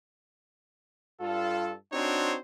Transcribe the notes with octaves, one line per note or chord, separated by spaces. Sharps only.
G2 F4 A4
C4 D4 D#4 F#4 C5 C#5